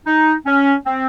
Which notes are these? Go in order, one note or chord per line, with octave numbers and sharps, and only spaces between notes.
D#4
C#4
C4